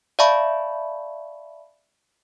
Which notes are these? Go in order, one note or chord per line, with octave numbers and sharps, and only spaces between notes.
D5 E5 F5 A5 B5 C#6